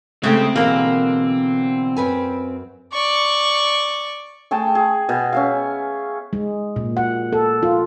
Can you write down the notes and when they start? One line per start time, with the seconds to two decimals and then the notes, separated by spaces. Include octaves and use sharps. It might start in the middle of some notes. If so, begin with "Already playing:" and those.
0.23 C#3 G#3 A3 C4 G4 G5
0.56 B2 D3 E3 A#3 G#4 A#4
1.97 F#2 B4 G#5
2.93 D5 C#6
4.51 A3 G#4 G5 A5
4.75 G#4
5.09 B2
5.33 C#4 E5 F5
6.33 G#3
6.76 A#2
6.97 F#5
7.33 A4
7.63 F4